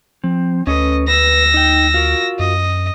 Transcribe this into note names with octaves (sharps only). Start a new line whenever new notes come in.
F3 C4
D2 C#4 A4 B4 D#5
B4 E6 A#6
D#4 G5
F4 F#4 A#4
F#2 D#5